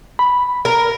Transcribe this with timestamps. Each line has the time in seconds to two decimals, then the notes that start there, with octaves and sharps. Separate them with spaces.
0.19 B5
0.65 A#4